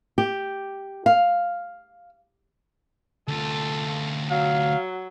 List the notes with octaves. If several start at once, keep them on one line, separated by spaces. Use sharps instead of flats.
G4
F5
D2 F4 A4
F#3 F5